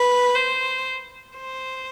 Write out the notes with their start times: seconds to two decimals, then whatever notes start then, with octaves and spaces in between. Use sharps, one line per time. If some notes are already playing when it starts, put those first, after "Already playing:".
Already playing: B4
0.35 C5
1.37 C5